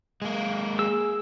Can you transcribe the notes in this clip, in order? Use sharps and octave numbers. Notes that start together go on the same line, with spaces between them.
G#3 A#3
G#4 E6